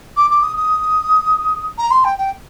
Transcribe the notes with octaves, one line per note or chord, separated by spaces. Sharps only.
D6
D6
D#6
D#6
A#5
C6
G5
G5